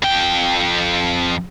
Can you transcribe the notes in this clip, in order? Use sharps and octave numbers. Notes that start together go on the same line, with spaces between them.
F2 G5